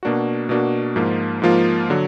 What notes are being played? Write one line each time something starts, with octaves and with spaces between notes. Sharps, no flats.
B2 A#3 D4 F#4
B2 A#3 D4 F#4
G#2 F3 A#3 F4
G#2 F3 A#3 F4
D3 F#3